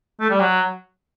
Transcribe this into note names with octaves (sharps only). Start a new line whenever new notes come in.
A3
G3
F#3